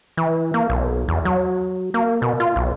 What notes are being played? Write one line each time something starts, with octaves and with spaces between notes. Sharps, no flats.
E3
A#3
B1
E2
F#3
A#3
B2
F4
B1